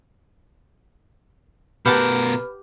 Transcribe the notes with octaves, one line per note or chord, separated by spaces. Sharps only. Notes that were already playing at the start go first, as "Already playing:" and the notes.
B2 G4 A#4 B4 F#5 A5 B5 F6